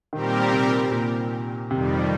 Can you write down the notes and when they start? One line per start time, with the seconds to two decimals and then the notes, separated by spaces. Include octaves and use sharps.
0.13 A#2 D#3 G3 C4 G4 A#4
0.52 C3
0.92 A#2
1.71 F2 C3 D#3 G3